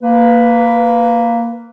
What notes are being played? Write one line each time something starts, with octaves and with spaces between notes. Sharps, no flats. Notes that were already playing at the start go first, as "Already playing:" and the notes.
A#3 B4